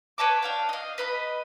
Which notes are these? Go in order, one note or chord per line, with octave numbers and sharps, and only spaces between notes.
B4 C#5 A5 D6
D4 F5 G5
D#5 F5
B4 D#5 B5